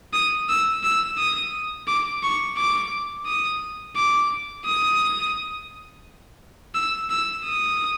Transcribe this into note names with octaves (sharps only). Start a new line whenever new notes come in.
D#6
E6
E6
D#6
D6
C#6
D6
D#6
D6
D#6
E6
E6
D#6